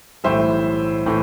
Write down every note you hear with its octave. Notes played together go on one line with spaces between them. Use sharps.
B1 A2 E3 G3 C5 E5
A2 E3